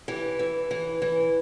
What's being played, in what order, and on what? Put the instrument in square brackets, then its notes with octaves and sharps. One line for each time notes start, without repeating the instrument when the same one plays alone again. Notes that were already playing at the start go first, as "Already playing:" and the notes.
[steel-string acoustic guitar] E3 G4
E3
E3
E3